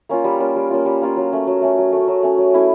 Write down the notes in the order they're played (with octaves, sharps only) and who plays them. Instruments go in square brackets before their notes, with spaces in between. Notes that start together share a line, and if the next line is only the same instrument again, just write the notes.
[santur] A#3 C#4 F4
G3
A#3 C#4 F4
G3
A#3 C#4 F4
G3
A#3 C#4 F4
F#3
A3 C#4
F#3
A3 C#4
F#3
A3 C#4
F#3
A3 C#4
F#3
A3 C#4 E4